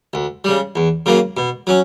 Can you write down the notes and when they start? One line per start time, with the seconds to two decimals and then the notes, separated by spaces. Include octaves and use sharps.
0.14 D2
0.44 C#3 G3
0.76 E2
1.06 C#3 F#3 A#3
1.37 B2
1.67 F#3 C#4